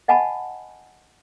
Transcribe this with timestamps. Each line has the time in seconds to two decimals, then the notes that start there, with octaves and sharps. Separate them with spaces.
0.08 D#5 F#5 G#5 A5 B5